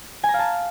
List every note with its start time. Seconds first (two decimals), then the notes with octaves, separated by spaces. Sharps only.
0.24 G#5
0.29 A#5
0.34 F5
0.39 A5